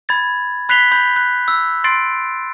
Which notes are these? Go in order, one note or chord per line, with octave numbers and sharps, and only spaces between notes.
B5 G#6 A6
B5 F#6 B6 C7 F7 G7
B5 G6
F#6
E6
C6 A6 C7 D7